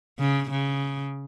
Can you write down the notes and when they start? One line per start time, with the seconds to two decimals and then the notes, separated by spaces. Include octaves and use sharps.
0.19 C#3
0.51 C#3